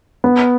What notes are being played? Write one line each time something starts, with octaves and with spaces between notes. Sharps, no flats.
B3